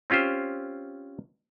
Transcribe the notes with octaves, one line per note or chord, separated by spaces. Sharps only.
C4 C#4 F4 G4 C5